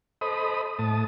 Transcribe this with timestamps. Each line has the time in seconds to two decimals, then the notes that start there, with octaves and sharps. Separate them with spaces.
0.21 A4 C5 D#5 B5 D#6
0.79 A2 A5 D#6